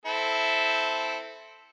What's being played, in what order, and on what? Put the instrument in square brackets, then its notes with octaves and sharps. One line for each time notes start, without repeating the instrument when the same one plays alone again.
[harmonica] C4 E4 A4